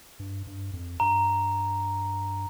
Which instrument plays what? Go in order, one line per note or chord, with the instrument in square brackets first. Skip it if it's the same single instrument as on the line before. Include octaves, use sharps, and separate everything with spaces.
[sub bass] G2
G2
F2
[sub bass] G2 [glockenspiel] A#5